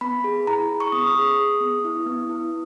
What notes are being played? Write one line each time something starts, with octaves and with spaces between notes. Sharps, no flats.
B3 B5
G#4
E4 A#5
G#4
C#6
B3 D#6
G#4
G#4
B3
E4
B3
E4